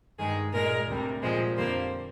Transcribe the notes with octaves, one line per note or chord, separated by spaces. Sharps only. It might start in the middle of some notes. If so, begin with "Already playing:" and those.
G2 D#3 G#3 G#4
A#2 G#3 A#4
D2 C3 G3
A#2 F3 G#3 C5
F2 D3 G3 A#3 C5